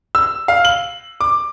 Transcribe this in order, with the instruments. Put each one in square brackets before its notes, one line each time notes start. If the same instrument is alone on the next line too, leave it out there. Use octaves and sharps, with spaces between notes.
[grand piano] E6
F5
F#7
D6